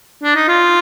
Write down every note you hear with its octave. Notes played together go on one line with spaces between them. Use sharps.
D4
D#4
F4